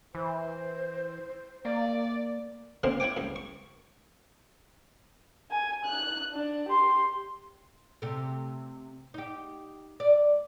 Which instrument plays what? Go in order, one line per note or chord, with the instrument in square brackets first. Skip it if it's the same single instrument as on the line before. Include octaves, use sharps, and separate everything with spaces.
[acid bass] E3 [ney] C5
[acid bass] A#3 [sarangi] D5
[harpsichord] B2 D3 A#3 C4 C#4
E4 C#5 G5 G#5 D6
C#2 F#2
C#6
[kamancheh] G#5
F#6
D4
G4 C6
[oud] C3 A3
D#4 G4
D5